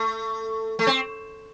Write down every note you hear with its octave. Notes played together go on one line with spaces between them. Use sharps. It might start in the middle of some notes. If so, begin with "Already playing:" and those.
Already playing: A3
A3
C4